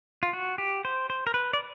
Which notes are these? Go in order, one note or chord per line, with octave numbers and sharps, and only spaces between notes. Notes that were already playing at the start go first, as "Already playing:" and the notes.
F4
F#4
G4
C5
C5
A#4
B4
D5